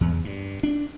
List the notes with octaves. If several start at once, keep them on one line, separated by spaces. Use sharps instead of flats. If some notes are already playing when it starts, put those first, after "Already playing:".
E2
G2
D4